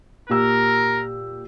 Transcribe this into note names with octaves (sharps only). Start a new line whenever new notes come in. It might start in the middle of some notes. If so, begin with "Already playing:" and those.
A#2 G4 A#4 E6